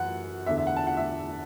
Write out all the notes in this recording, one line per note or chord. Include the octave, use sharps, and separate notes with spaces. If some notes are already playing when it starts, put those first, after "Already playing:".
Already playing: F#2 E3 F#5
E2 D3 E5
E5
F#5
A5
F#5
E5